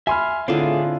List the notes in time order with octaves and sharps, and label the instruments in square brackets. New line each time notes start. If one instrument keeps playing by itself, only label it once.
[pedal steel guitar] E5 C6 F6 [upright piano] G#5 B5
[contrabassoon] A2 [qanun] D3 F4 [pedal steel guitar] C4 D4 G#4